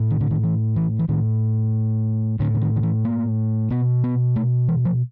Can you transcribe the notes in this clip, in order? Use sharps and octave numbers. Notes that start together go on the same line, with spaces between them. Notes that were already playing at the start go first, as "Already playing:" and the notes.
Already playing: A2
D#3
D3
D#3
E3
E3
E3
A2 D#3
A2 D3
D3
D#3
D#3
E3
A#3
B2 B3
B3
A3
E3
F3